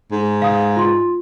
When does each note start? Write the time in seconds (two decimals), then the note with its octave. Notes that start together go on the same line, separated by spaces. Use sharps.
0.11 G#2
0.42 F5 D#6
0.76 F4 C6